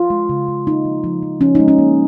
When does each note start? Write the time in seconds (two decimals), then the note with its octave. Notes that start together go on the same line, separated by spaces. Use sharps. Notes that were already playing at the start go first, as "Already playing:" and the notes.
Already playing: F4
0.10 G#3
0.29 C#3
0.48 C#3
0.66 A#3 D#4
0.85 F3
1.04 F3
1.23 F3
1.41 F3 C#4
1.55 G#3 D#4
1.68 C#4
1.78 A#3